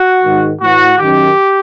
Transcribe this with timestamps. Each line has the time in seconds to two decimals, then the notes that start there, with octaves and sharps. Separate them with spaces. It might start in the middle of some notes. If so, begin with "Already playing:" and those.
Already playing: F#4
0.23 G#2 D#3
0.61 A2 E3 F#4
0.99 F#2 D#3 G4